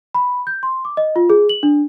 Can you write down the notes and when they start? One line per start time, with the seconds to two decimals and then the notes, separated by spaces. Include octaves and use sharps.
0.14 B5
0.47 G6
0.63 C6
0.85 D6
0.97 D#5
1.16 F4
1.30 G#4
1.49 F#7
1.63 D4